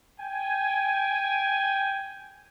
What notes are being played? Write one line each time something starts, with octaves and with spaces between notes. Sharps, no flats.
G5 G#5